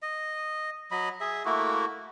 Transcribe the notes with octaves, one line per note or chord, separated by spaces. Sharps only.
D#5
F#3 D#5 B5
G#4 E5
A3 A#3 E4 F#4